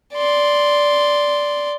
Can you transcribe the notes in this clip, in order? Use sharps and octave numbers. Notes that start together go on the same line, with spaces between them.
D5 C6